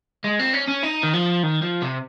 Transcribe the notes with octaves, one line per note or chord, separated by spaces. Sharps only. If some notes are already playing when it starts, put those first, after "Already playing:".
G#3
C4
C#4
C#4
D#4
D#3
F3
D#3
F3
C3